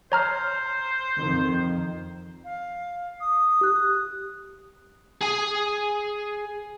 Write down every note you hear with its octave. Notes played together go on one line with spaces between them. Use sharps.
C5 C#5 A#5 F6
F2 D#3
F5
D#6
G4 F#6
G#4 G#5